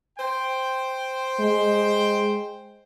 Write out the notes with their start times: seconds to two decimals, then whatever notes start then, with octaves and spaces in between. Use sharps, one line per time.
0.19 C5 G5
1.40 G#3